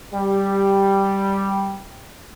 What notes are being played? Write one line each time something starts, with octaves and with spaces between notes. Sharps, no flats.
G3 G4